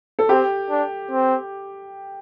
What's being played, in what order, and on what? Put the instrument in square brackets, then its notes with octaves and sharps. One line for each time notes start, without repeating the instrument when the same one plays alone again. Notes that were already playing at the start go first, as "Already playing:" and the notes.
[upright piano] A4
[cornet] C4 [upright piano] G4
[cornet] D4
C4